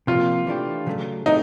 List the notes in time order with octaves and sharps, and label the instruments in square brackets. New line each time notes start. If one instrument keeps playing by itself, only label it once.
[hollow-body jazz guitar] C3 F3 A#3 [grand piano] F4
[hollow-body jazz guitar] E3 A3 D4 G4
C#3 F#3 A3
[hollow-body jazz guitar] E3 A3 C4 [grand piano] D#4